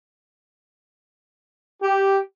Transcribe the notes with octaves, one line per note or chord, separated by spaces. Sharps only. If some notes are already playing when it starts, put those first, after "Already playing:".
G4